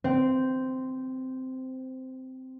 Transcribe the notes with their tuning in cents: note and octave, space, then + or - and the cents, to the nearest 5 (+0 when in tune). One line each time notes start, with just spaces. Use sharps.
C4 -10